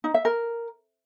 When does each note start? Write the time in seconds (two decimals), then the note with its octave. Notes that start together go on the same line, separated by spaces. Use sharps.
0.04 D#4
0.14 E5
0.25 A#4